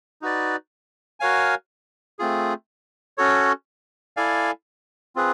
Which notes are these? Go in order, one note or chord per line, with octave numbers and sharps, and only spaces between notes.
D#4 F#4 B4 D5
F#4 A#4 C#5 F5 G#5
A3 C4 F4 G#4
C#4 F#4 A4 C#5
E4 A4 D5 F5 G#5
C4 F4 G#4 B4